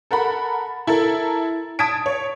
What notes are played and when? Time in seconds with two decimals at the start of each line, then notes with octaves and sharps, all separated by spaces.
0.11 A4 A#4 F#5 B5
0.87 E4 A4 A#4
1.79 A5 D#6 G#6 B6 D7
2.06 C#5